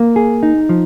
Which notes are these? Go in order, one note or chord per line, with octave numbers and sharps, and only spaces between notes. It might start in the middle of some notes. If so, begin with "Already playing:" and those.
Already playing: A#3
G#4
D#4
F3